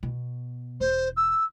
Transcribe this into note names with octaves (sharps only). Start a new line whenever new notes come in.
B2
E1 C5
E6